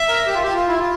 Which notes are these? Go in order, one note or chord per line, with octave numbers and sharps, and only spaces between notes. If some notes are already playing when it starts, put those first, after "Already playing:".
Already playing: E5
A#4
G4
F4
G4
F4
E4
F4